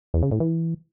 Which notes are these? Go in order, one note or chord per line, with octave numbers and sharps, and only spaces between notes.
E2
C#3
A2
E3